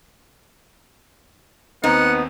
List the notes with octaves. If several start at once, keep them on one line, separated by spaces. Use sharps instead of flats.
D#2 B3 C4 D#4 F#5